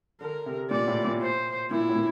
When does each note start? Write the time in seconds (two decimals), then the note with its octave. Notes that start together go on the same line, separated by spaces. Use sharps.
0.21 D3 A#4
0.46 C3
0.70 A#2 D5
0.88 A2
1.05 A#2
1.21 C5
1.71 A#2 E4
1.89 A2
1.96 A#2